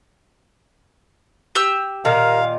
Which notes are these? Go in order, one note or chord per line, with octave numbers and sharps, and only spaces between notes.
G4 E6
A#2 D#3 A#4 F5